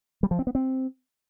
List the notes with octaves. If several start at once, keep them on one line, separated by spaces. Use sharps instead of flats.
G3
F3
C4
B3
C4